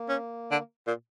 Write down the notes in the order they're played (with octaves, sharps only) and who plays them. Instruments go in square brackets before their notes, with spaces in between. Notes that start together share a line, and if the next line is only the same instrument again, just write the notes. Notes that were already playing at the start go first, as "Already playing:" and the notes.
Already playing: [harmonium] A#3
[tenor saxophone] C#4
D3
A#2